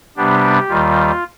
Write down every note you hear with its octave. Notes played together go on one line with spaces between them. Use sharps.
C3 G3 B3 D4 G4
D#2 D#3 G3 F4